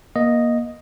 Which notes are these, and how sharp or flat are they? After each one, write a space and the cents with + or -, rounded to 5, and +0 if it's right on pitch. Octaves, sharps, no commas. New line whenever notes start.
A#3 +25 D#5 +0